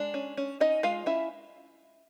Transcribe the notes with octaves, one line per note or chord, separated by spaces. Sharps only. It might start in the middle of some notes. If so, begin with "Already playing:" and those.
Already playing: G#3 D4
C#4
C#4
C#4 D#4 D#5
G#3 F4 F5
C#4 E4 E5